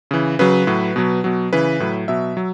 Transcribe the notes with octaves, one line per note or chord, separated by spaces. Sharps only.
C#3 E3
C#3 F#3 B4
A2 F#3
B2 F#3
B2 F#3
C#3 E3 B4
A2 F#3
B2 F#3 E5
F#3